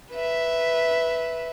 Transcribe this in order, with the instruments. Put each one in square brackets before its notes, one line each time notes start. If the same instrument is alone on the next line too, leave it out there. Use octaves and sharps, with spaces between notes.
[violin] B4 E5